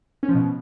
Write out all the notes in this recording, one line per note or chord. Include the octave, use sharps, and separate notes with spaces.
C#4
F3
B2